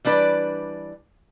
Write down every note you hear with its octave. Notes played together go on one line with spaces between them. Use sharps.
E3 G3 D4 B4 D5